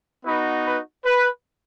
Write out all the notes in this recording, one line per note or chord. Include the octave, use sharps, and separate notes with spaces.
B3 D#4 F#4 B4
B4
B4